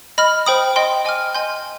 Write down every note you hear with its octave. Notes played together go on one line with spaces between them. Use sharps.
D#5 B5 F6
C5 G5 B5 D#6
D#5 G5 C6
D#5 G#5 D6 F6
D#5 G#5 C6 G6